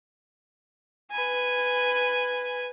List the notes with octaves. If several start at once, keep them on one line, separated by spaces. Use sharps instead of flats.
B4 G#5